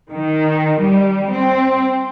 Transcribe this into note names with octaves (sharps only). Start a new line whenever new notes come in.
D#3
G3
C4